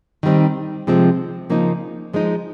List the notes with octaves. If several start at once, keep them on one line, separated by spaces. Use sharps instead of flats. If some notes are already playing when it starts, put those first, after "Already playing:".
D#3 G3 C4 D#4
C3 F3 G#3 C4
C#3 F3 A#3 D#4
F3 G#3 D#4